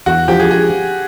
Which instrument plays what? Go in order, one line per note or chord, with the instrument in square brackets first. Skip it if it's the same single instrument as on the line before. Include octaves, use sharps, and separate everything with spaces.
[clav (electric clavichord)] E2 [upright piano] F#4
[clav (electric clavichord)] F3 [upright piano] G4
[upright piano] G#4
G#4